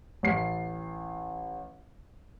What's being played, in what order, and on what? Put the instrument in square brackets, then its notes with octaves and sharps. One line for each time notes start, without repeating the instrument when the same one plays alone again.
[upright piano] A1 C7